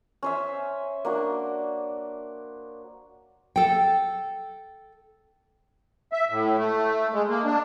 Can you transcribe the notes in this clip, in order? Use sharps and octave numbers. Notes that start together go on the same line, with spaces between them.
C#4 C5 E5
A#3 D4 F#4
A4 G5
E5
A2
A3
G#3
A#3
D4